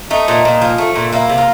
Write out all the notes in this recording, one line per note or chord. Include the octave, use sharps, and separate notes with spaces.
A3 D#4
A#2
A#2
F3
A3
A#2
A#3 E4
C3
F4